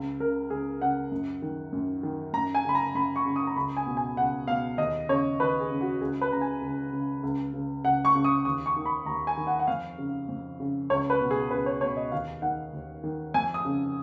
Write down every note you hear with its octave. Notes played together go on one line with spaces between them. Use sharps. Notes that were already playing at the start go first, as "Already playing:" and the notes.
Already playing: C#2
C#3 A#4
C#2 G#4
C#3 F#5
F#2
D#3
F#2
D#3
F#2 A#5
G#5
C#3 B5
A#5
F#2 B5
C#6
C#3
D#6
A#5
C#2 B5
G#5
B2
G#5
C#2 F#5
B2 F5
D#2 D#5
C#3 C#5
D#2 B4
G#4
C#3
F#4
C#2 G#4
B4
C#3 A#5
G#5
C#2
C#3
C#2
C#3
C#2 F#5
C#6
C#3
D#6
D#2 D#6
C#6
D#3
B5
D#2 A#5
G#5
D#3
F#5
F#5
F2 F5
C#3
F2
C#3
C#2 C#5
B4
B2
G#4
C#2 B4
C#5
B2 C#5
D#5
D#2 F5
D#3 F#5
D#2
D#3
F2 G#5
D#6
C#3